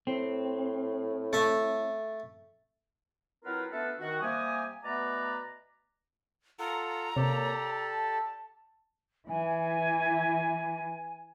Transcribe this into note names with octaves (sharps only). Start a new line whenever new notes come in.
A2 C4
A3 E5
F#3 C4 E4 F4 A#4 B4
A3 B3 D4 F4 A4 B4
D#3 F#4
C3 G3 A#3 G4 D#5 G#5
B2 A3 B3 B4 D5 A#5
F4 A4 F#5 A#5
C3 A#3 G4 A4 C#5 D5
A5
E3 G#5